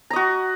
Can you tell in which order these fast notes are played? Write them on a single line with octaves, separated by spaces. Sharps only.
A#5 D#5 F#4